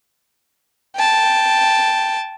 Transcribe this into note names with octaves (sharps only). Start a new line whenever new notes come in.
G5 A5